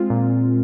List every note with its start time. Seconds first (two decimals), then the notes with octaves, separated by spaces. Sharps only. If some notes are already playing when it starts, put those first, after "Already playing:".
Already playing: G#3 C4 F4
0.10 A#2